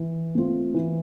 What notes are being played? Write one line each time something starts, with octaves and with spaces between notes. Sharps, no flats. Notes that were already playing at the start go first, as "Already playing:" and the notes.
Already playing: E3
A3 C4 F4
E3